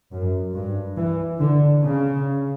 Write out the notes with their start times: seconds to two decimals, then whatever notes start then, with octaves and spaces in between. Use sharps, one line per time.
0.12 F#2
0.54 G2
0.97 E3
1.40 D3
1.82 C#3